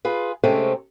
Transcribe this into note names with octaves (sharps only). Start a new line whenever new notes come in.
F4 G#4 B4
C3 G#3 A3 C4 C#4